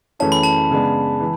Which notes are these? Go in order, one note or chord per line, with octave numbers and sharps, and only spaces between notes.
F#2 E3 A3 C#4 G#4 A5
B5
A5
C#3 G#3 B3 D4
E3